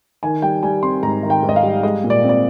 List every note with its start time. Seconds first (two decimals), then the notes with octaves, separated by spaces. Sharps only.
0.23 D#3 G#5
0.42 G3 G5
0.63 G3 G#5
0.83 C4 C6
1.03 G#2 A#5
1.23 D#3
1.30 G5
1.43 G#2
1.49 D#5
1.56 F5
1.63 G3
1.83 G#3 D#5
2.04 A#2
2.10 D5
2.24 C4
2.29 D5